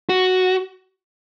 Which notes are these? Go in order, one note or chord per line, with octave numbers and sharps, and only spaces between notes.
F#4